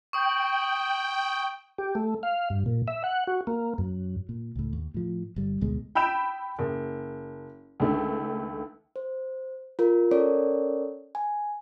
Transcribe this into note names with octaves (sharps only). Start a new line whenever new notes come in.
G5 C#6 D#6
G4
A3
F5
G2
A#2
E5
F#5
F#4
A#3
F#2
A#2
C#2 A2
D#2
A2 F3
G1 G3
A1 D2 B2 G#3
G5 B5 E6 G6 D7 E7
F#1
C#2 D3 D#3 A3
C5
F4 A#4
C#4 A4 A#4 C#5 D5
G#5